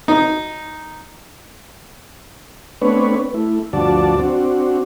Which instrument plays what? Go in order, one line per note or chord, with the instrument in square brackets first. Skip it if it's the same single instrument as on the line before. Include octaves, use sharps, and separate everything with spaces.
[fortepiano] D#4
[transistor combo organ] A3 B3 C4 D4 B4 C#5
A3 E4
D2 G2 F3 F#4 D5 A5
C4 D4 F#4